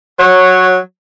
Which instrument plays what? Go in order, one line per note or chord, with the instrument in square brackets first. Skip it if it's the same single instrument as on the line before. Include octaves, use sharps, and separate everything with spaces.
[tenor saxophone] F#3 [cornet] C#5